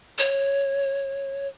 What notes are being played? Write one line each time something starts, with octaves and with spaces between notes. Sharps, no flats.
C#5